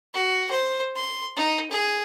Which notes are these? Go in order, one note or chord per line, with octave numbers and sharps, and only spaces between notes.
F#4
C5
C6
D#4
G#4